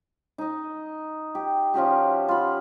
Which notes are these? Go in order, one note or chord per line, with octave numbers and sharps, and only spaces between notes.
D#4 D#5
G4
F3 C#4 F#4 G4
F4 B5